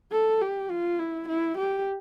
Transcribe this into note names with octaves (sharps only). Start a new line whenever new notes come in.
A4
G4
F4
E4
E4
G4